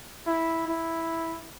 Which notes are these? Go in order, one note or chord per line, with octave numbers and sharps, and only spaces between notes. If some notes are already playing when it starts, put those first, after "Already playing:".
E4
E4